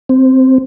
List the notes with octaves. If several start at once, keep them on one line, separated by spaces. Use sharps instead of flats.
C4